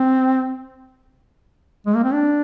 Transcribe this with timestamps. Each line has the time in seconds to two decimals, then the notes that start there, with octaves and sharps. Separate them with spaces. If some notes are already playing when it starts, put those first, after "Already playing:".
Already playing: C4
1.86 G#3
1.96 A#3
2.04 C4
2.13 D4